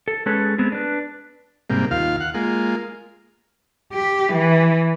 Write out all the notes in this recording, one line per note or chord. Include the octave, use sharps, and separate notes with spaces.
A4
G#3 C#4 G#4 A4 B4 C#5
G#3 B3 C4 G#4
D4 B4
G#2 C3 G3 A#3
D#2 F4 F5
F#5
G#3 A#3 F4
G4
E3